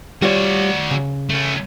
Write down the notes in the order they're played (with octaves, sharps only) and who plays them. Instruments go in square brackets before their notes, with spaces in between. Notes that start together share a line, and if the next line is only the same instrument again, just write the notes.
[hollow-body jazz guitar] G3 F4 C#5 [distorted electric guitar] F#4 D5
[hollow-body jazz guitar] C#3
[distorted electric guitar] A3 C#4